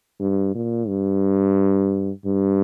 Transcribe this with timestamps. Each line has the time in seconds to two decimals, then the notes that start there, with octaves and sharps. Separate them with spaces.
0.20 G2
0.55 A#2
0.88 G2
2.25 G2